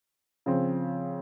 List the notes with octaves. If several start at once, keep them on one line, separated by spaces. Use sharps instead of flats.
C#3 F3 C4